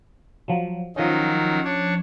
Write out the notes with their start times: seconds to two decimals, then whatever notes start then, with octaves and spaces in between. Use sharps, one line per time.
0.48 F3 F#3
0.96 D#3 F3 F#3 C#4 D#4
1.64 D4 C#5